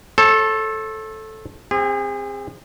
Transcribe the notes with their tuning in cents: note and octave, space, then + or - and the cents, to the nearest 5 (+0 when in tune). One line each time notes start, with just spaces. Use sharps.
A4 -5 C#5 -45
C4 +0 G#4 -35